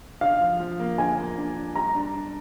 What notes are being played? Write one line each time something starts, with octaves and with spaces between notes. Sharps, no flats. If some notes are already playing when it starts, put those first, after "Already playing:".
D3 F5
F3
F3
A#3
D3 G#5
A#3
D4
D4
G3 A#5
D4
D4